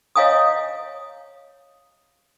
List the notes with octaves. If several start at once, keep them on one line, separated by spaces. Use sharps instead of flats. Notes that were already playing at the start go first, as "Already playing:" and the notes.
C#5 D#5 F5 G#5 A#5 D#6